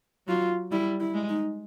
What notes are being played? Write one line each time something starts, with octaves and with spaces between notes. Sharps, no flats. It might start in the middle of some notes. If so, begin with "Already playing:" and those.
F#3 F4
G3 E4
E4
G#3
D#4